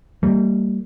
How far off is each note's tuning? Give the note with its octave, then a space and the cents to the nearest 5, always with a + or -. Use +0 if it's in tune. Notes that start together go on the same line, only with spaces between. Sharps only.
G3 -10 A#3 -35